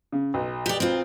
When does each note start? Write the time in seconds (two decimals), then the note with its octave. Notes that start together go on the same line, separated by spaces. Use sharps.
0.12 C#3
0.34 B1
0.66 G4 D5
0.80 C4 F4